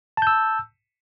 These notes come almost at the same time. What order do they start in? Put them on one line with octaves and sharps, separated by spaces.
A5 G6 E6